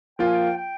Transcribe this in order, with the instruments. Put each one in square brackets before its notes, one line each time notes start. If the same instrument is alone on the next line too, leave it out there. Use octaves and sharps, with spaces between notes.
[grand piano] F3 A#3 F4 [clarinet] G5
[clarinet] G#5
G5
G5